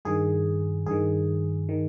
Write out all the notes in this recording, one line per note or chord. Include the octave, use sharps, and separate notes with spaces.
G2 D#3 G#4
G2 D#3 G#4
D#3